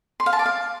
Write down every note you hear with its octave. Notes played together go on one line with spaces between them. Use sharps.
C6
F5
A5
D5
F5